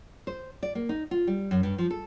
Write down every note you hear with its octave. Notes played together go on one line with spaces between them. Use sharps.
C5
D5
A#3
D#4
F4
G3
F#2
G2
F3
A4